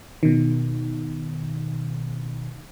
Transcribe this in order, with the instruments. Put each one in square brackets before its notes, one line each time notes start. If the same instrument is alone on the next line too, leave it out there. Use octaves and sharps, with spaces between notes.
[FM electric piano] B2 D#3